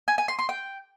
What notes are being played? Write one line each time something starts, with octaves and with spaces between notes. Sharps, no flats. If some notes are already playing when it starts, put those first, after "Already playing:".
G#5
G#5
C6
C6
G5